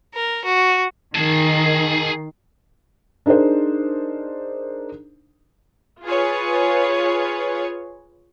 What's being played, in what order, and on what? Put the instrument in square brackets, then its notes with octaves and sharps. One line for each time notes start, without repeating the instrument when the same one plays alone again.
[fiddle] A#4
F#4
[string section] D#3 [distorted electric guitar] G#4 A5
[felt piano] D4 D#4 G#4 A#4 C5
[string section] F4 G#4 B4 C#5